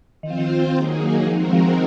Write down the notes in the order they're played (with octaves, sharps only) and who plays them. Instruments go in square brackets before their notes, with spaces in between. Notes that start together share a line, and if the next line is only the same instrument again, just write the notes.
[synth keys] D#3 [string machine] C4 F4 C5
[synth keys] F3
D#3
[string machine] F#3 A#3 D#4 G#4
[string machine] D#3 G#3 C4 F#4 A#4 [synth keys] F3
[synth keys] F3